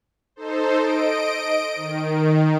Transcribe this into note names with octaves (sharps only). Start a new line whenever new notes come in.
D#4 A4 C5
D#5 D7
D#3